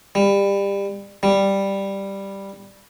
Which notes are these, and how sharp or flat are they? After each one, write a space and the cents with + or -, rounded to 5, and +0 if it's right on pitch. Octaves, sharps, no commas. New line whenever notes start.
G3 +25
G3 +5